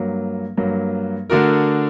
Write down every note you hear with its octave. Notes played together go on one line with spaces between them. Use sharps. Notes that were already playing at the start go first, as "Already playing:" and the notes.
Already playing: G2 F#3 A#3
G2 F#3 A#3
D3 A3 D4 F#4 A#4